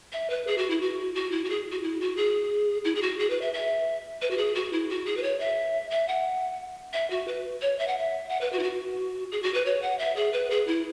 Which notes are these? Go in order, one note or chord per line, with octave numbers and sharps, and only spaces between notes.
E5
B4
G#4
F#4
E4
F#4
F#4
E4
F#4
G#4
F#4
E4
F#4
G#4
E4
G#4
F#4
G#4
B4
E5
E5
B4
F#4
G#4
F#4
E4
F#4
G#4
B4
C#5
E5
E5
F#5
E5
F#4
B4
C#5
E5
F#5
E5
F#5
B4
F#4
E4
F#4
G#4
F#4
B4
C#5
F#5
E5
G#4
B4
G#4
E4